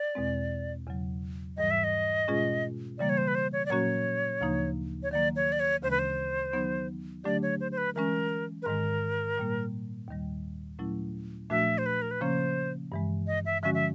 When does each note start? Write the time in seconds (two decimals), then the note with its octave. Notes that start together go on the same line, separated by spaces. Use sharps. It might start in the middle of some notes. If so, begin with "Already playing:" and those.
Already playing: D5
0.15 E2 B2 G#3 C4
0.87 E2 C#3 F#3
1.57 G#2 E3 G3 D#5
1.71 E5
1.84 D#5
2.28 B2 G#3 C#4 F4 G#4
2.99 C#3 E3 G3 A#3 D5
3.09 C#5
3.17 C5
3.28 B4
3.35 C5
3.53 C#5
3.66 D5
3.70 A#2 F#3 A#3 C#4 F#4 C#5
4.41 D2 C#3 F3 A#3 D#4
5.03 C#5
5.11 D#3 F#3 A#3 D5
5.36 C#5
5.52 D5
5.60 C#5
5.83 D2 C#3 E3 G#3 C#4 C5
5.91 B4
5.99 C5
6.53 D#3 F#3 B3 D#4
7.24 D3 F#3 A3 D4 G4 D5
7.42 C#5
7.60 C5
7.72 C5
7.78 B4
7.95 E3 G#3 C#4 A#4
8.62 B4
8.66 G#2 D#3 G#3 A#4
9.38 A#2 G3 A#3
10.08 D#2 D#3 G3
10.79 A#2 F#3 A3 C#4 E4
11.50 A#2 F3 A3 D4 F#4 E5
11.78 C5
11.86 B4
12.02 A#4
12.11 B4
12.21 C#3 F3 A#3 C#4 C5
12.92 G2 E3 G#3
13.27 D#5
13.46 E5
13.63 D3 F3 G#3 C#4 F#4 E5
13.74 E5